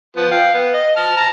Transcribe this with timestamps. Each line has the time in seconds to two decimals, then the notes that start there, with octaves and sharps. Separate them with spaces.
0.17 F3 B3
0.31 F5 G5
0.54 B3
0.74 D#5
0.96 A5 F6
1.17 A5 A#5